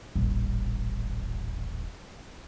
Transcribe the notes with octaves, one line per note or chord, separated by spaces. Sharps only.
D#1 A1